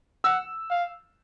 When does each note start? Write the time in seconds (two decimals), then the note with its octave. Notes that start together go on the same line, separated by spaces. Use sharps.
0.24 F#5 E6
0.71 F5